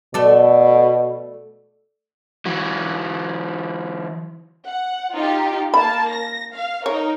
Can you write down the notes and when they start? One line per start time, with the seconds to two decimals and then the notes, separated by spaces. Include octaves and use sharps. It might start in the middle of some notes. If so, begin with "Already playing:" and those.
0.14 B2 A3 A4 D5
2.46 E3 F#3
4.67 F#5
5.14 D#4 F4 G4
5.74 A#3 A5 B5
6.11 A#6
6.53 F5
6.86 D#4 A#4 C#5